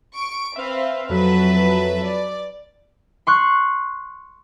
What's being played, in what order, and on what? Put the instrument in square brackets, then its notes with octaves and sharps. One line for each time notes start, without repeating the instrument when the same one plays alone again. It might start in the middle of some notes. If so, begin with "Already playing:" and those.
[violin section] C#6 D7
[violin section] C4 B4 C5 [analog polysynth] E5 F5
[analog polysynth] F2 F#3 [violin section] B4 E5 A5
[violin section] D5
[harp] C6 C#6 F#6